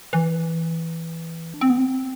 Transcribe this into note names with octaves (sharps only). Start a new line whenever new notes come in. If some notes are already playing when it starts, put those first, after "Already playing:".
E3
D4
C4
B3
C4